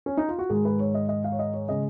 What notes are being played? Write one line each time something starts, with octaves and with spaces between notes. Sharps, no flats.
C#4
D#4
F4
F#4
G#2 D#3 G#3 G#4
B4
C#5
D#5
D#5
F5
C#5
D#5
C#5
C#3 G#3 D#5